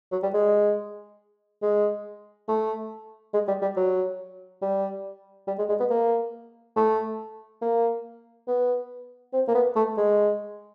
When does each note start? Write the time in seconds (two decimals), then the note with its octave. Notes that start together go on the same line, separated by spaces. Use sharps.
0.12 F#3
0.23 G3
0.34 G#3
1.62 G#3
2.48 A3
3.33 G#3
3.48 G3
3.62 G3
3.76 F#3
4.62 G3
5.48 G3
5.59 G#3
5.69 G#3
5.80 B3
5.91 A#3
6.76 A3
7.62 A#3
8.47 B3
9.33 C4
9.48 A#3
9.55 B3
9.76 A3
9.97 G#3